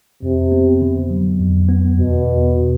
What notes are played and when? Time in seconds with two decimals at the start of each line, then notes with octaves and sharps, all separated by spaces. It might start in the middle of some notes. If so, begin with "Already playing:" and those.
0.22 F2 C3
0.52 B3
0.81 D3
1.10 F#3
1.39 F2
1.68 B3
1.97 E2 B2
2.27 E2
2.57 B2